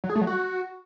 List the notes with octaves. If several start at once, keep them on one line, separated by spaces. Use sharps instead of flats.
F#3
G#4
A3
F#3
F#4